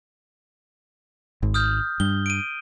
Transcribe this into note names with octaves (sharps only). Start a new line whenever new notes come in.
G#1
D#6 F6 G6
G2 G7
D7 D#7